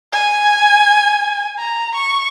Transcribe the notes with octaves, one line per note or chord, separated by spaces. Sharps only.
G#5
A#5
C#6